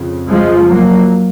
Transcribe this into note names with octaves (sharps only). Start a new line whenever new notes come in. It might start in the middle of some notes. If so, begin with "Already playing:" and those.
Already playing: F2 C#3
F3 G#3
F#3 A#3